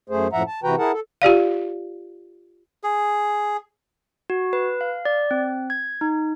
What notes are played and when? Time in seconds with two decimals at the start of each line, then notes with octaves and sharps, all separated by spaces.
0.10 F#2 A3 G#4 C5
0.33 F#2 A2 F3 E5 F#5 A#5
0.47 A5
0.64 C3 E3 F#4 B4 G5 A#5
0.78 E4 G#4 A#4 F#5 A5
0.93 A4
1.22 F4 G4 D5 F5
2.83 G#4
4.30 F#4
4.53 B4
4.81 F5
5.05 D5
5.31 C4
5.70 G#6
6.01 D#4